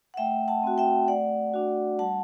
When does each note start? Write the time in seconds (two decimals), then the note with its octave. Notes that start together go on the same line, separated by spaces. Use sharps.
0.14 F#5
0.17 A3 E5 G5
0.48 F#5 A5
0.63 C4 F#4
0.78 E5 G5
1.08 A3 D5 F#5
1.54 D4 F#4
1.99 G3 F#5 A5